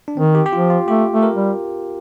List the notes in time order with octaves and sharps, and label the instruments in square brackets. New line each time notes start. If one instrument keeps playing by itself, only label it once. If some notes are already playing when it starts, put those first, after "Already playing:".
[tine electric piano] D4
[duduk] D#3 [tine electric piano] C4
[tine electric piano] G4
G4
[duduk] F3 [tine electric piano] F4
[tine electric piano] F4
[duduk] A3 [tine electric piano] G4
[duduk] A3
[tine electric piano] A#4
[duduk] G3